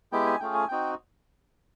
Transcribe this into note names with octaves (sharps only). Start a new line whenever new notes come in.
G#3 B3 E4 G4 G5
G#5
A3 C#4 F4 G#4 G5
G#5
C4 D#4 F#4 G5